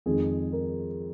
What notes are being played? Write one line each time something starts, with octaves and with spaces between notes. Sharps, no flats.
F2 D#3 G#3 G#4
A#4